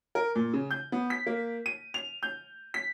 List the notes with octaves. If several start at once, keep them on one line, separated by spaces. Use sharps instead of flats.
A#4
A#2
C#3
G6
B3
B6
A#3
D#7
F7
G6
B6